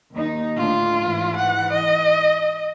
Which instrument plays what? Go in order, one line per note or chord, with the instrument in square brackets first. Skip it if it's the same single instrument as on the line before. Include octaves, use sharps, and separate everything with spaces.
[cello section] D#2 D#4
[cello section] D2 A2 D4 [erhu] F4
[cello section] G#2 E3
[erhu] F#5
D#5